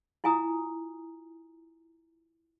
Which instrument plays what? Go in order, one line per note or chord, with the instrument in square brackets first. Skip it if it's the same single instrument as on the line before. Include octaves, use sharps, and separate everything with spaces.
[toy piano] E4 F4 G#5 A#5 D#6